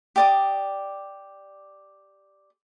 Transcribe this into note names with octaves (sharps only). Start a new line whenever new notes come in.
G4 D5 D#6